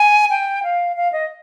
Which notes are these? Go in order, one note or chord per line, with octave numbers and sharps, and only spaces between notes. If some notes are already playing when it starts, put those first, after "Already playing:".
Already playing: G#5
G5
F5
F5
D#5